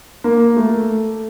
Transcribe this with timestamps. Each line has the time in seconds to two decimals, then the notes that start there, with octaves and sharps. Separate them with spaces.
0.24 A#3
0.57 A3